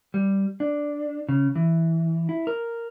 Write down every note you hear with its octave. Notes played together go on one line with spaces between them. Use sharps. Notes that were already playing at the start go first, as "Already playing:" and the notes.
G3
D4
C#3
E3
E4
A#4